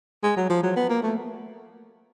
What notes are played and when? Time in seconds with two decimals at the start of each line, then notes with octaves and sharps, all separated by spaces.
0.23 G#3
0.37 F#3
0.50 F3
0.63 F#3
0.77 B3
0.90 A#3
1.03 A3